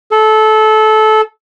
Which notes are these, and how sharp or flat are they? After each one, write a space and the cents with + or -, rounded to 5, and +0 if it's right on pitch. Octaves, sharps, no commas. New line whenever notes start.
A4 -20